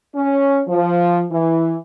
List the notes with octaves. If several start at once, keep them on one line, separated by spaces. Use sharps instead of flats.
C#4
F3
E3